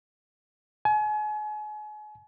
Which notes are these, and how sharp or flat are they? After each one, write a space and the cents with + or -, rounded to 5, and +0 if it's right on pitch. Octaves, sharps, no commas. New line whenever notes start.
G#5 +35